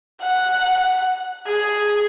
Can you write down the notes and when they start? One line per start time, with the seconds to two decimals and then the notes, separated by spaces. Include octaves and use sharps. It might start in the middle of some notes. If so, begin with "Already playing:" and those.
0.22 F#5
1.47 G#4